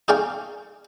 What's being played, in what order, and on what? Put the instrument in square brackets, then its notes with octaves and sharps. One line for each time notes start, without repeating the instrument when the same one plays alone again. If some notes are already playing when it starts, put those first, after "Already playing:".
[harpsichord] D#4 G#4 D5 F5 G5 C#6